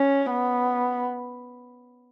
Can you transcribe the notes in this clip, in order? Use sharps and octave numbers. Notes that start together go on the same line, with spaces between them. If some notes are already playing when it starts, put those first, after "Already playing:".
Already playing: C#4
B3